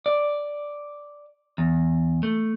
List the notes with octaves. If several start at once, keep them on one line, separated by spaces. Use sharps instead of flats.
D5
E2
A3